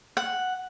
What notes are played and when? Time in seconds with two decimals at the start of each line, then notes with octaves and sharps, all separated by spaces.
0.17 F#5